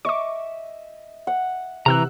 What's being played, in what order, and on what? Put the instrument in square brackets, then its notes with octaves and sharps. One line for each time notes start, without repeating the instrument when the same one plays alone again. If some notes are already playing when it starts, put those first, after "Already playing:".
[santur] D#5 E5 [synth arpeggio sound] C#6 D6
[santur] F#5
[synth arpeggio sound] C3 E6 F#6 [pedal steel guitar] E3 A#5